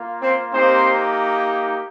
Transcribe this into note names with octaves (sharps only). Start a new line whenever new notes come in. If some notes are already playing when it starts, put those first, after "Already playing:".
Already playing: A#3 F4
C4 C5
A#3 C4 D#4 G4 C5